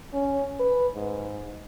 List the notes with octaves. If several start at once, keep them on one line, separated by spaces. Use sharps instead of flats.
C#4
B4
G#2